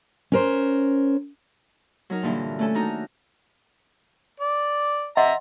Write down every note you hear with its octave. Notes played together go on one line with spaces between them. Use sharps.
C#4 A#4 C5
F#3 D#4 A#4
G2 A#2 D3 E3
A3 C#4 A4
D#3 D4 D#4 F#4 A#5 G6
D5
D#5 E5 F#5 A#5 C6